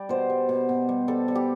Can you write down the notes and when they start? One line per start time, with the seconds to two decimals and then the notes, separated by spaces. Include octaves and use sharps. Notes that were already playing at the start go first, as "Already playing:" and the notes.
Already playing: G3 G4 D5
0.09 B2 C5
0.30 G3
0.49 B2
0.69 B2
0.89 G3
1.08 G3 A4
1.28 G3
1.35 G4